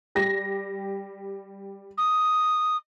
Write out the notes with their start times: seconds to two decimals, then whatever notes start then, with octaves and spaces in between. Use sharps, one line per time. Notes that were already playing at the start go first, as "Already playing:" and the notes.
0.15 G3 G4 A#6
1.98 D#6